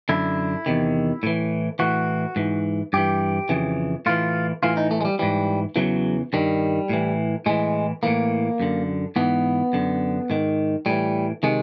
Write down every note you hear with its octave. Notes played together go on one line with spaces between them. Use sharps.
F#2 D3 E4
E2 C3 D#3
A2 E3
A2 E3 F#4
G#2 E3
G2 E3 G4
F2 C#3 E3
A2 E3 F4
A2 E3 F4
D#4
A3
G#3
G3
G#2 E3 G3
E2 C#3 E3 F#3
G2 D#3 G3
A2 E3
A2 E3 G#3
A2 E3 A#3
F#2 D3
G#2 E3 B3
F#2 D3
G#2 D#3
A2 E3 G3
C3 D#3 G#3